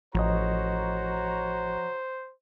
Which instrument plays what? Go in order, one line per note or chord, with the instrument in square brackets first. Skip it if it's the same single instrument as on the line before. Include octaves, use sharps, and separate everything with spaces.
[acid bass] A1 [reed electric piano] F3 D#5 [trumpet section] F#4 C#5 A#5 [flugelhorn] C5